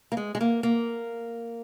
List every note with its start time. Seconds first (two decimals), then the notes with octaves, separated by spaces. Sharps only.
0.12 A#3
0.17 G#3
0.35 G#3
0.41 A#3
0.63 A#3